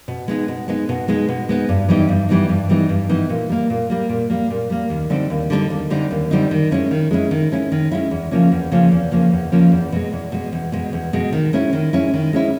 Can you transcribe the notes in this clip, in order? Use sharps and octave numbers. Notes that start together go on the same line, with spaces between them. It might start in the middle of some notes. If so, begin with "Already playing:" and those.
B2
G#3 B3 D#4
B2
G#3 B3 D#4
B2
G#3 B3 D#4
B2
G#3 B3 D#4
G2
E3 G3 B3 D#4
G2
E3 G3 B3 D#4
G2
E3 G3 B3 D#4
G2
E3 G3 B3 D#4
A#2
G3 A#3
A#2
G3 A#3
A#2
G3 A#3
A#2
G3 A#3
D#2
D3 G3 C4 D#4
D#2
D3 G3 C4 D#4
D#2
D3 G3 C4 D#4
D#2
D3 G3 C4 D#4
D#3
G#3 C#4 E4
D#3
G#3 C#4 E4
D#3
G#3 C#4 E4
D#3
G#3 C#4 E4
E2
C#3 F3 A#3 C#4
E2
C#3 F3 A#3 C#4
E2
C#3 F3 A#3 C#4
E2
C#3 F3 A#3 C#4
E2
B2 G#3
E2
B2 G#3
E2
B2 G#3
E2
B2 G#3
D#3
G#3 C#4 E4
D#3
G#3 C#4 E4
D#3
G#3 C#4 E4